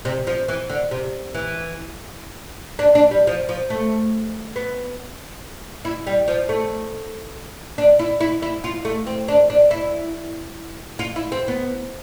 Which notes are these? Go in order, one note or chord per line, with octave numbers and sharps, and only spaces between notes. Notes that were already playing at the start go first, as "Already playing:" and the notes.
C3
F3
E3
D3
C3
E3
D4
D4
G3
F3
F3
A3
B3
E4
G3
F3
A3
D4
E4
E4
E4
F4
A3
C4
D4
D4
E4
F4
E4
C4
B3